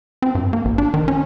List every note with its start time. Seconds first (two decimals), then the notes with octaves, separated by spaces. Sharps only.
0.22 C4
0.35 G2
0.53 A#3
0.65 A1
0.78 D4
0.94 D#3
1.08 C#4